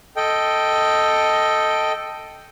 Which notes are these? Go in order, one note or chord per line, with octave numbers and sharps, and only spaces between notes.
A4 D#5 G5